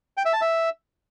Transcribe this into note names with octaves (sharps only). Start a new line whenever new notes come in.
G5
E5
A5
E5